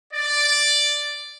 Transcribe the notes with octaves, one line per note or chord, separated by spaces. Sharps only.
D5